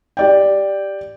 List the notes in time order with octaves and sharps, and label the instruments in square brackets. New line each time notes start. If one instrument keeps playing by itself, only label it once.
[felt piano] G4 D5 G5